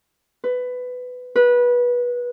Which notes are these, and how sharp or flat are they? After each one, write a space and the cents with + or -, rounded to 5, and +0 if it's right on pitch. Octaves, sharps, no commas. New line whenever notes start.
B4 +15
B4 -20